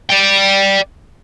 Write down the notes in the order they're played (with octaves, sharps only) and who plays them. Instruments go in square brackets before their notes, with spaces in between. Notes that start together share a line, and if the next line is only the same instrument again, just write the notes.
[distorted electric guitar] D5 G5